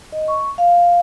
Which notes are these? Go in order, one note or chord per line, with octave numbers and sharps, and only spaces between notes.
D#5
C#6
F5